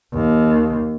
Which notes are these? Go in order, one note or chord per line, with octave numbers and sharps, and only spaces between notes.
D#2